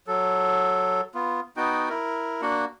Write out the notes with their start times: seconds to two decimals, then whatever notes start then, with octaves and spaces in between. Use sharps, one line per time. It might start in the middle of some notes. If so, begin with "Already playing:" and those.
0.08 F#3 A4
1.15 B3 F4
1.57 B3 D#4 F#4 G5
1.89 E4 A#4
2.42 A#3 D4 F#4 F#5